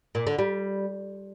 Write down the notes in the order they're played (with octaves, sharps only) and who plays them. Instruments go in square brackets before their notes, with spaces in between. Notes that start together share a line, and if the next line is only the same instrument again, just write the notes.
[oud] A#2
D3
G3